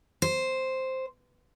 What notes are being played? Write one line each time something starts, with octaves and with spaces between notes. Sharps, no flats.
C5